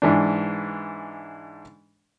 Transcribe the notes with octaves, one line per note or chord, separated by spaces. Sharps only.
G#2 E3 D4